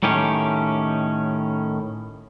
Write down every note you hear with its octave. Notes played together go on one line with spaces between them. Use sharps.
A2 D#3 C#4 G4